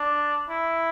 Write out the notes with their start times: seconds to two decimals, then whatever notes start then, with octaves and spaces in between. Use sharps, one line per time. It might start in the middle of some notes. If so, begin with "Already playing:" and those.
Already playing: D4
0.50 E4